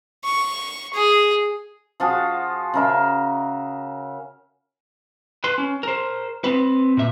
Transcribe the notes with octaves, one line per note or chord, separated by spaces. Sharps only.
C#6
G#4
F3 F4 F#4 G#4
C#3 A#4 E5
B4 C6
C#4
A#4 C5
C4 B4
A#2 E5